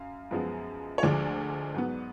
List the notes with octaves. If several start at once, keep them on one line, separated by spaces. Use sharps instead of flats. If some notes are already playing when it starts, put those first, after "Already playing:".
Already playing: F#2 F5
F#2 F3 G#3 B3
C#5
D2 D3 F3 G#3 D5
G#2 F#3 B3